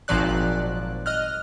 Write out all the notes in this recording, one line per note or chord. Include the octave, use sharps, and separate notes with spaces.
G#1 A#2 F3 F#3 D5 F#6
D#5 F6 F#6